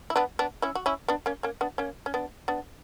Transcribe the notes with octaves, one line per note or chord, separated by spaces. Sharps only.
E4
B3 D4
B3 D4
C#4 E4
F#4
C#4 E4
B3 D4
A#3 C#4
A#3 C#4
B3 D4
A#3 C#4
C#4
B3 D4
B3 D4